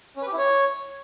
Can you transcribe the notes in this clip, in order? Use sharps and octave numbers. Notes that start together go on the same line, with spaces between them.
C#4
B4
G4
E4
C#5